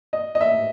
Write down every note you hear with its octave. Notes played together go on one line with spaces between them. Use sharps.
D#5
D#5
E5